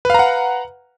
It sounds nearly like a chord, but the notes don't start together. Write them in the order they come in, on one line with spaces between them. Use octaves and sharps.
B4 F5 A#5 F#5